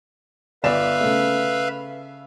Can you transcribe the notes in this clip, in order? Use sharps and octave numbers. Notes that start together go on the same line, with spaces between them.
G1 B4 D5 E5 F5 E7
C#3 A3